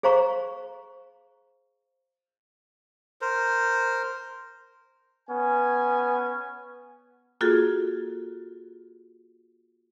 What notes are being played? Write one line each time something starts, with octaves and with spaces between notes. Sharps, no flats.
G#4 C5 F5 A#5 C#6
A#4 C5
B3 C#4 G#5
A#3 F4 F#4 G#4 A4